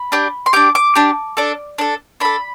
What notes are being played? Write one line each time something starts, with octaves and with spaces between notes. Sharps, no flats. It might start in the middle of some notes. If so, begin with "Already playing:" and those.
Already playing: B5
D4 G4
C6
D4 G4 D6
D6
D4 G4
D4 A4
D4 A4
D4 A4 B5